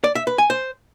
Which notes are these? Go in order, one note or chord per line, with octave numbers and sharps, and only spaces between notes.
D5
E5
B4
G#5
C5